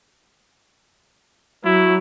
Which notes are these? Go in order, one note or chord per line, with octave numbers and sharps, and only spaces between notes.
F#3 E4